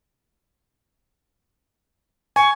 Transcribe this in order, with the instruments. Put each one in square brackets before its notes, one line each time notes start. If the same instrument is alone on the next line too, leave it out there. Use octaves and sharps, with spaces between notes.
[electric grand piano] G#5 [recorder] C#6